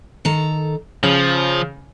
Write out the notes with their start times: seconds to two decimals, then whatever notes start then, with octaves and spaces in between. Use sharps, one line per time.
0.25 D#3 A4 A#5
1.03 C#3 F3 C#5